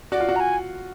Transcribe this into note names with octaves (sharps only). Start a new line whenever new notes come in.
F#4 D5
F4
F#4
A#5
G#5